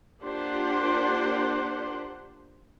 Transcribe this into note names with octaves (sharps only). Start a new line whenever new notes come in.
A#3 D4 F4 G4 C5 F#5